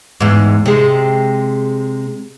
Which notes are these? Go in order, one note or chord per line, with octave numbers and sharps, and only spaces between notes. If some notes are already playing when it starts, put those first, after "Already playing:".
E2 G#2
C3 G#3